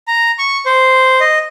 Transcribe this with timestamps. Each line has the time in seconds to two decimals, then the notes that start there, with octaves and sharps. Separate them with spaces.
0.08 A#5
0.39 C#6
0.66 C5
1.20 D#5